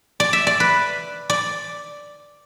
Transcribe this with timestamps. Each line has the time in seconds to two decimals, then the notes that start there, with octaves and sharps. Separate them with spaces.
0.20 D5
0.33 E5
0.47 D5
0.60 B4
1.30 D5